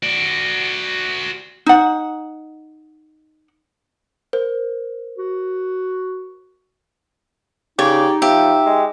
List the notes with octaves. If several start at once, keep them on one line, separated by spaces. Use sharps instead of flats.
F#4 D5
D#4 F#5
A#4 C5
F#4
C#3 D#4 G4 C#5 D5
F3 G4 E5
G#3